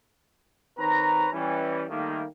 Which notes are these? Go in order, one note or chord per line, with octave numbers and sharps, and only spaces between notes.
D#3 C4 B4 C#5 A#5
E3 G3 C#4
D#3 G3 A3 A#3